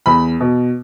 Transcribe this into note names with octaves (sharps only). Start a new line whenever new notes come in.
E2 B5
B2